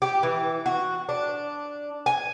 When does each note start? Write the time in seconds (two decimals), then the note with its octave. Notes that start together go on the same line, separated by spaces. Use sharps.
0.02 G4
0.23 E3
0.66 F#4
1.09 D4
2.06 G#5